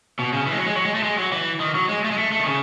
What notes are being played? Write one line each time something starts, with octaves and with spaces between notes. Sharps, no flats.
B2
C#3
E3
G#3
F#3
G#3
F#3
G#3
A3
G#3
F#3
E3
D#3
F#3
G#3
A3
G#3
A3
A3
D#3
C#3